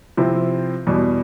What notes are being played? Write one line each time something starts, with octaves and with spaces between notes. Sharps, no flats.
C3 F3 C4 E4
E2 B2 G3